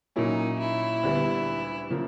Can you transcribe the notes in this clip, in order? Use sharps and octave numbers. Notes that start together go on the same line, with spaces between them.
A#2 F#3 A#3 C#4 D#4 E4
E4
D2 D3 G3 B3
C#3 F3 A#3